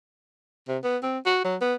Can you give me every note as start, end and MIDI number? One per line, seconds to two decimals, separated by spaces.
0.68 0.78 48
0.84 0.97 59
1.03 1.18 60
1.26 1.40 66
1.44 1.56 54
1.61 1.74 59